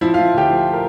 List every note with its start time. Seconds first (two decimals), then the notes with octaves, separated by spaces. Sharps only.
0.01 F3 E4 E5
0.14 F4 F5
0.18 F3
0.34 D2 G4 G5
0.49 F3
0.73 A#4